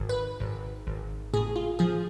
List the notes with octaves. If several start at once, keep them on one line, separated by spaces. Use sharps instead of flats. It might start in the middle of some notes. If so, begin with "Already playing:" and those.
Already playing: G#1
B4
G#1
G#1
A2 G#4
F4
F3 G#4